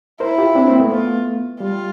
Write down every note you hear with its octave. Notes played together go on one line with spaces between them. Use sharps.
E4 A#4 C5
F4 G4
C4 D4
A#3 C4
A3 B3
F4
G3 F4